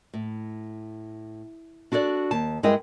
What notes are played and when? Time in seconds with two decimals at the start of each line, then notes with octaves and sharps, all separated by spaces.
0.14 A2
1.92 D4 F#4 A4 C#5 D5
2.31 D#2 A5
2.63 G2 G#3 E4 A#4 D#5 G5